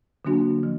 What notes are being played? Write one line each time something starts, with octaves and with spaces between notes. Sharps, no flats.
D3 F#3 A#3 D4 F#4
F3